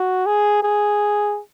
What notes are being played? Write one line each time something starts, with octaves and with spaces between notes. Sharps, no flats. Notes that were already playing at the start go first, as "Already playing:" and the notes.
Already playing: F#4
G#4
G#4